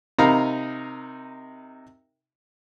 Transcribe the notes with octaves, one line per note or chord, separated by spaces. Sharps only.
C3 D#4 A#4 F5 A#5 B5